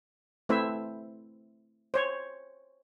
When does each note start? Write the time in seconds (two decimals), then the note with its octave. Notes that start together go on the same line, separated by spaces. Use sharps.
0.49 A3 C4 E4 B4 C5 E5
1.94 C5 C#5